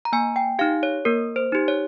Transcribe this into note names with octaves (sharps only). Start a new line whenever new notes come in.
A#5
A#3 G#5
G5
D#4 G4 F5
C#5
A#3 A#4
C5
D#4 G4
C#5